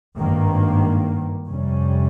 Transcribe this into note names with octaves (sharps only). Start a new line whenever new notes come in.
G#1 G2 D#3 A#3
F2 C3 G3 C#4